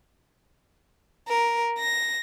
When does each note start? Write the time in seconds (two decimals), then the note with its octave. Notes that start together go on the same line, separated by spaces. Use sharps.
1.28 A#4
1.79 A#6